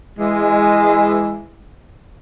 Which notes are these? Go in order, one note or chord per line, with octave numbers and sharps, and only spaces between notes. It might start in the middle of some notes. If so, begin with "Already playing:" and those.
E3 G#3